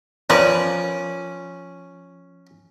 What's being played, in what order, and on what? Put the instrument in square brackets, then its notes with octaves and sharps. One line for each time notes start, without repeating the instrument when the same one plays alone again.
[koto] F3 [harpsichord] C#4 [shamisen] A#4 B4 D5